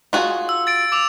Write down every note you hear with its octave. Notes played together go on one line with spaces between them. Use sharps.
F4 F#4 G#4
E6
A6 D7
D6 E6 F7